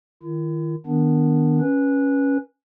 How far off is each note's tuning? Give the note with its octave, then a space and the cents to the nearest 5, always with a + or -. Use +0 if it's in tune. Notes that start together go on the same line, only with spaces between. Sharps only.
D#3 +0 E4 +45
D#3 +0 B3 +0 D4 +0
C#4 +0 B4 -15